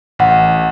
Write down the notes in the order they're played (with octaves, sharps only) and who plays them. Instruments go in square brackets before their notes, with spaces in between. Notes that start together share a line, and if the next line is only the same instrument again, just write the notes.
[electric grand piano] A1 [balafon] F#5